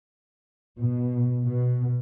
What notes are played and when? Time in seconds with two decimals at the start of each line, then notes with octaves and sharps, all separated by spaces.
0.78 B2
1.45 B2